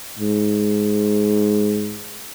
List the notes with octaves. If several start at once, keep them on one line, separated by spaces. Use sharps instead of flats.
G#2